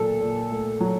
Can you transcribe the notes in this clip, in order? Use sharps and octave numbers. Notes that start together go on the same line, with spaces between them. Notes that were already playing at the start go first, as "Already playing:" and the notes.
Already playing: A#2 F#3 A4
A#2
A3
F#3